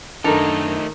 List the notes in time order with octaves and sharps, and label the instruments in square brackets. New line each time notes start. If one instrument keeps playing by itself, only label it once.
[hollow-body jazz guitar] F#2 D4 [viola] D#3 [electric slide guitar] A3 D#4 [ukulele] A4 A#4